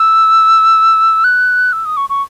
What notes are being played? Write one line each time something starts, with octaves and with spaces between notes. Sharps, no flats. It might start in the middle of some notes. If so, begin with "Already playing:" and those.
Already playing: E6
F#6
E6
D#6
C#6
C#6